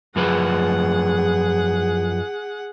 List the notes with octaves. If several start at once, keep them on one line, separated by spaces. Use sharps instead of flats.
F#2 F3 G#4 B4 F#5